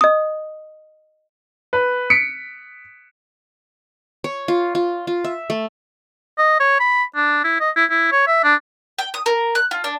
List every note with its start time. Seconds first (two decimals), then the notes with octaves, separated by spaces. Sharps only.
0.01 D#5 D#6
1.73 B4
2.10 B6 C#7 D7
4.24 C#5
4.48 F4
4.75 F4
5.07 F4
5.24 E5
5.50 A3
6.38 D#5
6.60 C#5
6.80 B5
7.16 D4
7.44 E4
7.60 D#5
7.76 E4
7.90 E4
8.12 C#5
8.27 E5
8.44 D4
8.99 G5
9.14 D#6
9.26 A#4
9.55 F#6
9.71 F4
9.84 D4